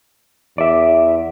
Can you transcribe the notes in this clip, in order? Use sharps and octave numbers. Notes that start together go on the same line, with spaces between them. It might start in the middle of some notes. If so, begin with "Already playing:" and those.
E2 D5 E5